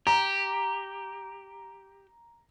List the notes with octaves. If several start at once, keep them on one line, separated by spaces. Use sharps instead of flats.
G4 A#5